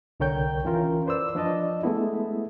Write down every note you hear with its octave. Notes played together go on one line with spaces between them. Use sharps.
C2 D3 A#4 C#5 G5 G6
E3 C#4 F4 A#4
B4 C5 D5 E6
F3 D4 D5 D#5 A5
G#3 A3 B3 E4